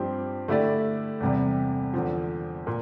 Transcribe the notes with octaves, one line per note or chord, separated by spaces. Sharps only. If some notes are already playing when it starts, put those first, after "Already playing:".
Already playing: G2 F3 C4 G4
D3 A3 E4 G4 D5
E2 C3 G3
E2 D3 F3
A#2